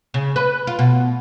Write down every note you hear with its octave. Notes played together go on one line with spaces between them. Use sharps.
C#3
B4
F4
B2